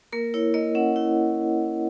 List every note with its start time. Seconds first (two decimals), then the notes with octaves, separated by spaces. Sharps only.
0.12 A#3 A#4
0.34 E4 C#5
0.54 A#3 D#5
0.75 C#4 F#5
0.96 E4